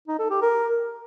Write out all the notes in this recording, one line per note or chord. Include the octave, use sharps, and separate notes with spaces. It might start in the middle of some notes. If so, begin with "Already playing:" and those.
D#4
A4
G4
A#4